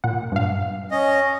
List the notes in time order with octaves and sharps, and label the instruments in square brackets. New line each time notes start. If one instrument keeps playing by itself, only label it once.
[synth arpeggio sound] A#2 F#5
G2 F5
[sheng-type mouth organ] C#4 D#5